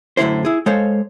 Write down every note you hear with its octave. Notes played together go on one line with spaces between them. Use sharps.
F#2 A2 D3 E4 C5
E4 G#4
G#3 A4 C5 C#5 F5